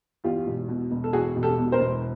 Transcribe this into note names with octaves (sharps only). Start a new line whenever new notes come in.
E2 F4 G4
E1
B2
E1
A4
E2 F#4 G#4
E1
G4 A4
B2
A#4 C5
E1